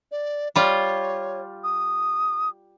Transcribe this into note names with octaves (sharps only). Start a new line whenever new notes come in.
D5
G3 F4 C#5
D#6